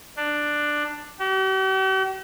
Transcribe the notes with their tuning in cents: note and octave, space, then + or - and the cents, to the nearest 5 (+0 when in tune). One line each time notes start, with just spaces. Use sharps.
D4 +10
G4 -45